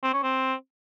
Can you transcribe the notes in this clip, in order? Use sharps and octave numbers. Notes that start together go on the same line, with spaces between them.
C4
C#4
C4